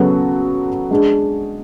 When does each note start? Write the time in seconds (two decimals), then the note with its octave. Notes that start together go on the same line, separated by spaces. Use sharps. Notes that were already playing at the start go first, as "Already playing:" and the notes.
Already playing: C#3 F#3 B3 F#4 A4
0.91 G#3 D4 G#4